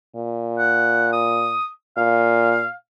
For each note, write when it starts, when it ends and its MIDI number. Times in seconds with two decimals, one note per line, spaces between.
0.16 1.55 46
0.58 1.08 78
1.13 1.67 87
1.97 2.63 46
1.97 2.72 77